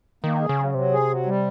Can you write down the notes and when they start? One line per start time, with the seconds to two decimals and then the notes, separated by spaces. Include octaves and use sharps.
0.24 D#3 A#3
0.41 G#4
0.49 C#3
0.58 F#3
0.74 C3 F#3
0.92 G#4
1.09 F#3
1.26 G3